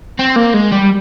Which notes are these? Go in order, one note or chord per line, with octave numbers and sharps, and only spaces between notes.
C4
A#3
G#3
G3